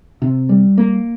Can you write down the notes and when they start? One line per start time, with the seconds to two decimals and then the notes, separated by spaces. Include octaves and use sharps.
0.22 C3
0.49 G3
0.78 A#3